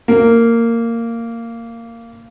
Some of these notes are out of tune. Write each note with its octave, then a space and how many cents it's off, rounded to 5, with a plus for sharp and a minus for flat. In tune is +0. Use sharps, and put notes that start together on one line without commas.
A#3 -15